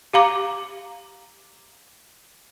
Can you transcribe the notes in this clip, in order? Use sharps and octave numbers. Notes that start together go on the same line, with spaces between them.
G4 F5 A#5 D6